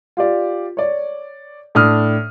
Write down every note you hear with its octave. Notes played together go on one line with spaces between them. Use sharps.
F4 G4 D5
C#5 D5
A2 D4 D#6 F6